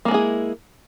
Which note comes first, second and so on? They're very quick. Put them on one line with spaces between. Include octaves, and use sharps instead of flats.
A#3 G#3 E4 G#4